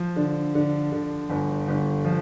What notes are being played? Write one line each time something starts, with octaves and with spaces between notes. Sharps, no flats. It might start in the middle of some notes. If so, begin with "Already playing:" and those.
Already playing: F3
D3
D3
D3
G1
G1
F3